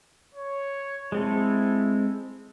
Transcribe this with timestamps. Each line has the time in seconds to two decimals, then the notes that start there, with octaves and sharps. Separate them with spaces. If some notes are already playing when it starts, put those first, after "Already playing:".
0.34 C#5
1.12 G#3 C4 E4 A4